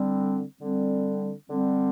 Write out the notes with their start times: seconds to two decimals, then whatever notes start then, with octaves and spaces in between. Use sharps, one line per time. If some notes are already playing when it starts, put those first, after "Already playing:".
Already playing: D3 G3 C4
0.60 D3 G3 C4
1.50 D3 G3 C4